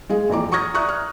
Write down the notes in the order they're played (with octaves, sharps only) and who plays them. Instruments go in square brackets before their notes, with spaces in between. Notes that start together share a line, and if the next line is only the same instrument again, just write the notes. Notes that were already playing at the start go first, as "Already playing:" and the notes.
[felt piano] G#3 G#4 F5
A#1 F2 E3 A#5 D6
A#5 C#6 D#6 F6 G#6 A#6
D5 E5 A#5 C#6 D#6 F#6
F6